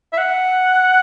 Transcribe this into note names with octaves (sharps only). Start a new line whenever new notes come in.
E5
F#5